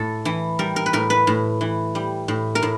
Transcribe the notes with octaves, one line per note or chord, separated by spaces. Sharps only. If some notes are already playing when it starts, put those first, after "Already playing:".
Already playing: A2 A4
E3
G3 A#4
A#4
B4
A2 A#4
B4
A2
E3
G3
A2
A#4
A2